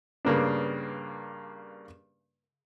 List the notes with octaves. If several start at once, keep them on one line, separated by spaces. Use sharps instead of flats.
G2 C#3 A#3 B3 D4